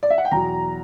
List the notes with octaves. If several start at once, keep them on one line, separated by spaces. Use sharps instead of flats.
D5
E5
F#5
G5
E2 B2 F#3 A#5